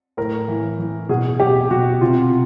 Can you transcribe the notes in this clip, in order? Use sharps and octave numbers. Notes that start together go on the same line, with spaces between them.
A2 A#4
E3
E3
B2 G#4
B2 G4
B2 F#4
C3 F4